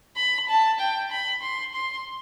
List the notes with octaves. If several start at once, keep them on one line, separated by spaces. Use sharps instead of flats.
B5
A5
G5
B5
C6
C6